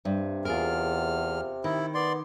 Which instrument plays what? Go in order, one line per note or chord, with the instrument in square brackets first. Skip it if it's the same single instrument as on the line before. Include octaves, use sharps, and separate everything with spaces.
[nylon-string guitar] G2 [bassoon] C3
[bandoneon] E2 F6 [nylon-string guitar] F4 G#4 A#4
[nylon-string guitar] D#3 [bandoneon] E4
[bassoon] B3 [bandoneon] D5 C6